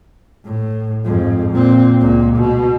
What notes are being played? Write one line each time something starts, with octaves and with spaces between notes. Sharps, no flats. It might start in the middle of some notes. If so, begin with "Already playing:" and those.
A2
F2 G#2
A#2 C4
C#2 A#2
B2